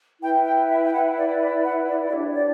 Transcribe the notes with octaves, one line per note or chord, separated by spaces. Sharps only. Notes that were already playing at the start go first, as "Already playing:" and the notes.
E4 B4 G5
G5
E5
G5
F#5
D5
D5
F#5
D5
D4 G4 C#5 D5
D5